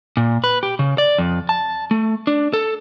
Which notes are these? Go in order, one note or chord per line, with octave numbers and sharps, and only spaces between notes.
A#2
B4
G4
C#3
D5
F2
A5
A3
D4
A4